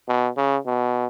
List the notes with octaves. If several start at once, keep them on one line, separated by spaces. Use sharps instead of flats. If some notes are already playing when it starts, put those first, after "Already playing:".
B2
C#3
B2